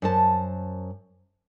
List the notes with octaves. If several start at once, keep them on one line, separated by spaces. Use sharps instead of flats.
F#2 C5 A5